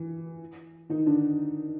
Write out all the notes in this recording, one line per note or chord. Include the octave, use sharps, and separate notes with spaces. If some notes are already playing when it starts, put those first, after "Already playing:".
Already playing: E3
D#3 D#4
D3 D4